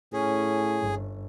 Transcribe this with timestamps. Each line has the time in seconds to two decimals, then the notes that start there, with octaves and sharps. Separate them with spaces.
0.13 A2 C#4 G#4
0.80 G1